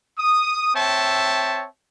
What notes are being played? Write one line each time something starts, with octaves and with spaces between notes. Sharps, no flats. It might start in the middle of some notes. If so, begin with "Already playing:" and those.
D#6
C4 C#5 E5 G5 A5